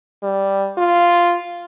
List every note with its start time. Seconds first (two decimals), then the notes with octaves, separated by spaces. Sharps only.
0.23 G3
0.78 F4